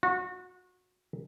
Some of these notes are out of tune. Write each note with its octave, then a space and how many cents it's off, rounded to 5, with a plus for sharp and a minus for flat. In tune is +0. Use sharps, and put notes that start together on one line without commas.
F#4 -25